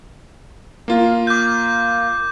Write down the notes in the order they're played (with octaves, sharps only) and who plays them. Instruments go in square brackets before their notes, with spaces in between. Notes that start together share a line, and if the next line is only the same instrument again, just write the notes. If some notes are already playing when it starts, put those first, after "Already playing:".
[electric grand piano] A#3 F4
[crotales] D6 G6